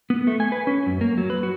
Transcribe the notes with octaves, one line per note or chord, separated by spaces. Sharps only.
B3
A3
G#5
B4
C#4
F#2
A#3
F#3
B4
F#4